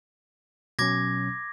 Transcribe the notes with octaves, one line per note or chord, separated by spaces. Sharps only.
B2 F#3 C#4 D6 G#6 A#6